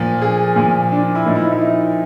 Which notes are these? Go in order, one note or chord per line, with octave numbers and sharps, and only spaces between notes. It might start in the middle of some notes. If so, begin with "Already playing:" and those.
Already playing: A#2 F3
G#4
A#2 F3
D4
D4
E4
A#2 F3 D#4
E4
D#4
E4
D#4